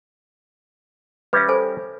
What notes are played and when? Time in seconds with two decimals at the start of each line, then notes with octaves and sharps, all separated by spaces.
1.33 G3 C#4 B4 E5
1.48 A4 C5 G#5